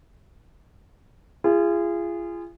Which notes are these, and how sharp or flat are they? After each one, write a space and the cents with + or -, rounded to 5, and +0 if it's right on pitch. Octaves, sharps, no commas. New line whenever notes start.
F4 -35 G#4 -20